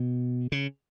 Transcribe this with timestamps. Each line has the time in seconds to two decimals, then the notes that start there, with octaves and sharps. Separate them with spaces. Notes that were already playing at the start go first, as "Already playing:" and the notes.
Already playing: B2
0.52 C#3